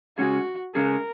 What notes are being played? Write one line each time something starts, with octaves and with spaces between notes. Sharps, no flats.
C#3 G#3 C#4 F#4 G#4
C#3 G#3 C#4 G#4 A#4